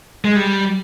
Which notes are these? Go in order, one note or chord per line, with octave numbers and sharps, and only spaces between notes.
G#3
G3